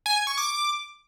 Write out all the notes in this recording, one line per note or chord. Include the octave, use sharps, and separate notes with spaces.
G#5
G#6
C#6
D6